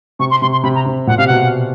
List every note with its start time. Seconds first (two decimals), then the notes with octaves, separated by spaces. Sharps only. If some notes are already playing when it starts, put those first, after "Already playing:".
0.19 C3 C#6
0.31 C6
0.42 C3 C6
0.52 C6
0.63 C3 B5
0.75 A#5
0.86 C3
1.07 A#2 F#5
1.17 C3 F5
1.27 B2 F#5